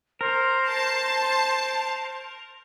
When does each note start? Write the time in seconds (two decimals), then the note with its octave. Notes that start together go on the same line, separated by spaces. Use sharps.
0.21 A#4 C5
0.68 A5